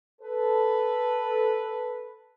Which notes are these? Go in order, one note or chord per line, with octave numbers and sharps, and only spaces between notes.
A4 B4